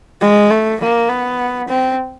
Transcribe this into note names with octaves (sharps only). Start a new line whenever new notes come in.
G#3
A3
A#3
B3
C4